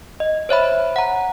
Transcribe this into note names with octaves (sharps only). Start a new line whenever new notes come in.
D#5
C5 C#5 E5 B5
F#5 A#5